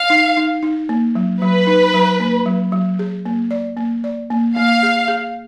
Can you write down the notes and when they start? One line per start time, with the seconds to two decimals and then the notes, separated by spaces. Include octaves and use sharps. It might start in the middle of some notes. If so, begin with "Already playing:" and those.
Already playing: F5
0.10 D#4
0.37 D#4
0.63 D#4
0.89 A#3
1.15 F#3
1.41 F#3 B4
1.67 D#4
1.94 F#3
2.20 A#3
2.46 F#3
2.72 F#3
2.99 G#4
3.26 A#3
3.51 D5
3.77 A#3
4.04 D5
4.30 A#3
4.56 A#3 F5
4.83 G#4
5.08 G#4